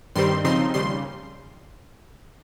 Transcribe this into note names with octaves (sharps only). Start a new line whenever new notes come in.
G2 D#3 G3 C4 C6
C#3 F3 C4 D#4 C6
D#2 C#3 G3 C6